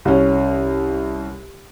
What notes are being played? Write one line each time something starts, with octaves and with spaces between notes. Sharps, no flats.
C2 C#4